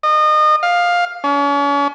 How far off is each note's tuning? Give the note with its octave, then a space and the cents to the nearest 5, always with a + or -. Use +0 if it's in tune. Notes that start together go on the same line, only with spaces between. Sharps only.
D#5 -30
F5 +10
C#4 +40